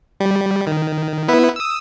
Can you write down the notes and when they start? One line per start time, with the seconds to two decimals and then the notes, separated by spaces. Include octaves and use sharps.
0.20 G3
0.67 D#3
1.28 B3 E4 B4
1.56 D#6 E6